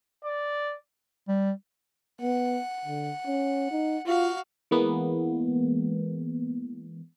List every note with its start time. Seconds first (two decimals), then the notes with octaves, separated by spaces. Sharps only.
0.24 D5
1.28 G3
2.22 B3 F#5
2.85 D3
3.27 C#4
3.71 D#4
4.06 F4 F#4 F5
4.71 E3 G#3 A#3 B3